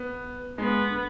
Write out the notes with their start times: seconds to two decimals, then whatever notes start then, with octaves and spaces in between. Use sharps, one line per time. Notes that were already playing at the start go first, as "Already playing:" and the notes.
Already playing: B3
0.58 G#3 B3
0.89 D3